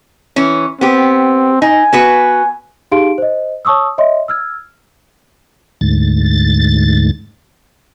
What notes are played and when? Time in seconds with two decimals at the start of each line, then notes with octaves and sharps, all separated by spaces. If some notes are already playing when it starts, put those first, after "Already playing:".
0.36 E3 C#4
0.81 B3 C4 G4
1.62 D#4 G#5
1.93 B3 F#4 B4
2.91 D#4 G4 G#4 F5 C6 D7
3.18 C5 D#5
3.65 C#5 A5 C#6 D#6 E6
3.98 C#5 D#5 E5 C6
4.28 E6 F6 G#6
5.81 D2 G#2 A6